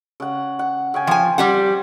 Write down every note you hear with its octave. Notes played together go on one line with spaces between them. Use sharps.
C#3 F#5
F#5
C#3 G5 G#5
F3 C5 G#5
G3 G4 F#5